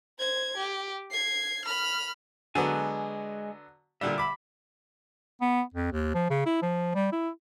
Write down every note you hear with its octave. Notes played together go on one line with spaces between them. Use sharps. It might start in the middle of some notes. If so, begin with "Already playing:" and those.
C5 G#6
G4
G#6 C7
B5 F6
D3 F#3 G#3 B3 G#5
A#2 D3 G3 E5
B5 D6
B3
F2
D#2
F3
C#3
E4
F3
G3
E4